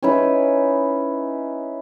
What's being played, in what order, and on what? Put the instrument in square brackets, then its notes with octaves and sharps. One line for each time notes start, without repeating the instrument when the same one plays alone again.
[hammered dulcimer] C#4 D#4 E4 B4